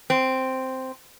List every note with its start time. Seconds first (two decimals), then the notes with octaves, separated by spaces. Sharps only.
0.10 C4